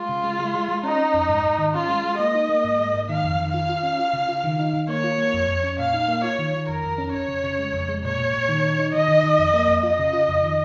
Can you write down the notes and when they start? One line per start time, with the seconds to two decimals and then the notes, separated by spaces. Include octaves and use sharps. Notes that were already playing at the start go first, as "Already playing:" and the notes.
Already playing: G#3 F4
0.09 C#3
0.24 G#3
0.39 G#3
0.54 G#3
0.68 G#3
0.83 C#4 D#4
0.99 C#4
1.14 F2
1.29 G#2
1.44 G#2
1.59 D#3
1.74 C#4 F4
1.89 G#3
2.04 G#3
2.19 A#3 D#5
2.35 D#4
2.49 A#3
2.64 G#2
2.79 G#3
2.94 G#2
3.09 D#3 F5
3.24 F2
3.39 D#3
3.54 F4 F5
3.69 F4
3.83 C#4
3.99 F4
4.13 C#3
4.28 F4
4.44 D#3
4.59 D#4
4.74 D#3
4.89 A#3 C#5
5.04 F4
5.18 A#3
5.34 F2
5.48 F2
5.64 C#4
5.79 A#2 F5
5.94 D#4
6.08 A#3
6.23 F4 C#5
6.39 D#3
6.53 D#3
6.69 F2 A#4
6.84 F2
6.98 C#4
7.14 F2 C#5
7.28 C#3
7.44 C#3
7.59 G#3
7.73 F2
7.88 G#3
8.03 A#2 C#5
8.19 A#2
8.33 A#2
8.49 D#3
8.64 D#4
8.79 D#4
8.93 D#3 D#5
9.08 D#3
9.23 D#3
9.39 F2
9.54 A#3
9.68 F2
9.83 F4 D#5
9.99 C#3
10.13 F4
10.29 F2
10.44 D#3